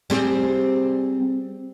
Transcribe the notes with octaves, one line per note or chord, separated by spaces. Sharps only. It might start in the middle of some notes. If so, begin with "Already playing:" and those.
G3 C4 G#4